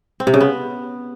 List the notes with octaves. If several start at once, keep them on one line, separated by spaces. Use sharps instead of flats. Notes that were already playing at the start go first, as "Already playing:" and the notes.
C4
C3
C#3
B3